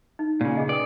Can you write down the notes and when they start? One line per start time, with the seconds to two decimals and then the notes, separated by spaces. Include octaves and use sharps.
0.19 D#4
0.41 A#2 C#3
0.55 G#4 D#5 G#5
0.69 B4 D5 G5 D#6